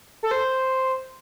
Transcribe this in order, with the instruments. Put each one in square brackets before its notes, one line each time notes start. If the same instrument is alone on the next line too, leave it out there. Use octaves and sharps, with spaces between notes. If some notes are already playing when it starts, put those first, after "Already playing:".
[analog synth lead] A4
C5